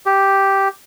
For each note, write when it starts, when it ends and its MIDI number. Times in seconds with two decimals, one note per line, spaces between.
0.06 0.68 67